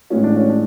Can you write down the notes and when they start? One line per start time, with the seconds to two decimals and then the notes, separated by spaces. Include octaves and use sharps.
0.10 A2 E3 G#3 C#4
0.24 D4
0.36 C#4
0.49 D4